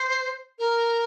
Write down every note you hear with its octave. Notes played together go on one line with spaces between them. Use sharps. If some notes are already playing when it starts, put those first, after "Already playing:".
Already playing: C5
A#4